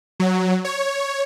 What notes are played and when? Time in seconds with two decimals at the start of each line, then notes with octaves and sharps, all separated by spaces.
0.20 F#3
0.65 C#5